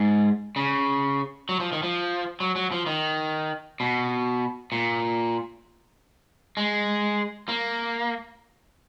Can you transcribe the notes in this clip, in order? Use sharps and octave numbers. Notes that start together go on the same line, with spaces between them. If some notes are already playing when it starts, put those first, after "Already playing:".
Already playing: G#2
C#3
F#3
F3
D#3
F3
F#3
F#3
F3
D#3
B2
A#2
G#3
A#3